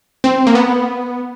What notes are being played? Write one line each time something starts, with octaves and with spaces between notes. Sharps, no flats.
C4
A#3
B3